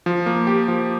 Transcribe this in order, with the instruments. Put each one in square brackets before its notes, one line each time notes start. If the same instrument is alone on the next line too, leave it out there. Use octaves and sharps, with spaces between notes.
[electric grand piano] F3
A#3
G4
F3